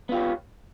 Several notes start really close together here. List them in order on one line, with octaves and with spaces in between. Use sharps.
B3 F4 G4 C#5